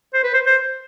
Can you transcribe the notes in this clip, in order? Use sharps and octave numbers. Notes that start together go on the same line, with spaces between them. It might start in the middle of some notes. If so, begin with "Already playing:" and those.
C5
B4
C5
C5